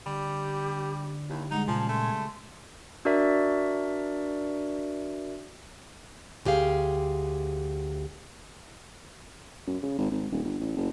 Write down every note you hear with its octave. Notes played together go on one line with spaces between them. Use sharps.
D3 G3 G4
D#2 E4 G4
G3 G#3 D#4 F#5
A#2 C#3 F3 G#3 G#5 A5
A3 C6
D4 F#4 A#4 D5 E5
D2 G4 G#4 F5
F#2
C#3
G#1
G#1
D#1
G1
A1
F#1